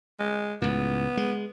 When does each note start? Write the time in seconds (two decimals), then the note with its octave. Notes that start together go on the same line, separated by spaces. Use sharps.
0.20 G#3
0.62 C#2 A2 B3
1.17 G#3